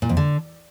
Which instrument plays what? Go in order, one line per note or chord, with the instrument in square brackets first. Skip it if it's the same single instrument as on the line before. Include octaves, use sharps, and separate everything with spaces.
[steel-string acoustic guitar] A#2
F2
D3